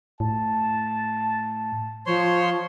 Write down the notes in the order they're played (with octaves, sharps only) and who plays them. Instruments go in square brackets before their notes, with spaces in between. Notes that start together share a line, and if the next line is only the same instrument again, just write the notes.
[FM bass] A2 [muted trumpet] A5
[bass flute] F3 [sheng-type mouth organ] C5 C#5 C6